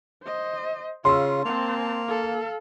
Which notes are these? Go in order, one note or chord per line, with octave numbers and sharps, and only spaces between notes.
C5 D#5
C#3 F4 C6 E6
A#3 C4 A5
A4 F5